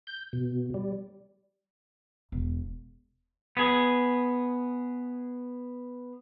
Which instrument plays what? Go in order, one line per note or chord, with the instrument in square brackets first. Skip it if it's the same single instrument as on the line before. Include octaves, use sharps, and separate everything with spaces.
[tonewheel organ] G6
B2
G3
[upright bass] E1
[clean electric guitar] B3 G#4